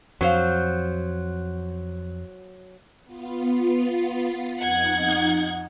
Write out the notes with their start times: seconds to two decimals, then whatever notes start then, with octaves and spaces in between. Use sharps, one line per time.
0.21 F2 F#3 C5 F5
3.04 B3 F4
4.60 F2 D#4 F#5 G#6